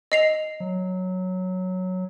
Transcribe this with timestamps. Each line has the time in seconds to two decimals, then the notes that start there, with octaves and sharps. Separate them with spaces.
0.12 D#5 C7 F7
0.60 F#3